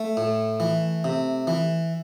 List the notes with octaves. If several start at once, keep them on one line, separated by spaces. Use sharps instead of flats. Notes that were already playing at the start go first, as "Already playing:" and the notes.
Already playing: A3
A2
E3
C3
E3